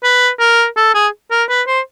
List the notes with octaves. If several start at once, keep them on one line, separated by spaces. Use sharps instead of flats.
B4
A#4
A4
G#4
A#4
B4
C5